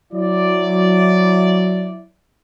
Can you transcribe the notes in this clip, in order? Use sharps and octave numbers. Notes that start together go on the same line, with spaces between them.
F#3 E4 D5